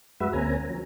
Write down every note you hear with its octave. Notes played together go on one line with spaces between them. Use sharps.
F#2 G#3 F#4 B4 E5
D2 A#3 C4 C#4 G#5 A#5
F3 F#3 C#4